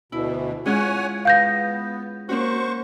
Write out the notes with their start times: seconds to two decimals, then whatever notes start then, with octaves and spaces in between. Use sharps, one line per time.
0.12 D2 B2 E4
0.66 G#3 C#4 F4 C#5 F#5 G#5
1.25 B3 F5 G6 A#6
2.29 A#3 C#4 F#4 C5 C#6